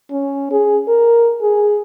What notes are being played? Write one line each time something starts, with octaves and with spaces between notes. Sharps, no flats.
C#4
G#4
A#4
G#4